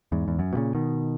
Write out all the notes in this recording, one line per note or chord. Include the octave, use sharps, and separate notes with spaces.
E2 G#2
E2
F#2
B2
A#2 C#3
B2 D#3